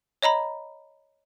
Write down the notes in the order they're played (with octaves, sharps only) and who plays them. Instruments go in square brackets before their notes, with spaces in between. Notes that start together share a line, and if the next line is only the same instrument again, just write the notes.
[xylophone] C#5 D#5 A#5 B5